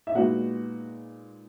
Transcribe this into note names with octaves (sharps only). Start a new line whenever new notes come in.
E5
A#2 G#3 B3 D#4 F#4 F#5